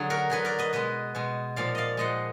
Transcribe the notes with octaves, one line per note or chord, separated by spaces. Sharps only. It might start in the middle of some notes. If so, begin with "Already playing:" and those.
Already playing: D3 F#3 G#4
F#4 A#4
D3 F#3 G#4 B4
A#4 D5
B4 D#5
B2 G#3 B4 D#5
B2 G#3
A#2 F3 G#3 D5 F5
D5 D#5 F5
A#2 F3 G#3 D#5 F#5